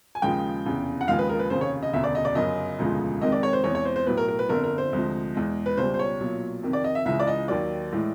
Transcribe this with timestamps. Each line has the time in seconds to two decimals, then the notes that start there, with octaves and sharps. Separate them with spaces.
0.15 G#5
0.22 D#2 C#3 F3 G#3 G5
0.66 F1 E2 C#3
1.01 F#5
1.07 D#2 C#3 F3 G#3 F5
1.19 B4
1.29 A#4
1.39 B4
1.50 F1 D#2 C#3 C5
1.61 C#5
1.83 D#5
1.93 E1 D2 C#3 E5
2.04 D5
2.15 D#5
2.25 D5
2.35 G1 F#2 C#3 D#5
2.78 E1 D2 C#3 F3 G#3
3.21 F2 C3 D#3 G#3 D#5
3.32 D5
3.43 C#5
3.53 C5
3.64 E2 C3 E3 G#3 C#5
3.75 C#5
3.85 C5
3.96 C5
4.06 B1 A2 F#3 B4
4.17 A#4
4.28 A#4
4.39 B4
4.49 G1 F2 D3 A#4
4.64 A#4
4.78 C5
4.93 D2 C3 F3 G#3
5.35 E2 B2 G#3
5.66 B4
5.77 C#2 B2 G3 C5
5.94 C5
5.99 C#5
6.20 B1 A#2 F#3
6.63 F2 C3 D#3
6.73 D5
6.84 D#5
6.95 E5
7.05 C#2 C#3 E3 G#3 E5
7.20 D5
7.27 D#5
7.48 D#2 D#3 F#3 D5
7.92 A2 E3 G#3